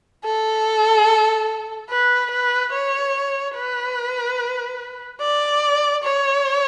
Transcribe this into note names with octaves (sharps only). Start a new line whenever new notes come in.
A4
B4
B4
C#5
B4
D5
C#5